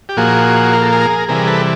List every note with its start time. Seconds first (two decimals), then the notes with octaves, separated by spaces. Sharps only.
0.09 G4
0.17 A#2 F3 A#3 F#4 G#4
0.73 A#4
0.82 A4
0.92 G#4 A#4
1.28 C3 E3 G3 G#4 A#4
1.47 A4 B4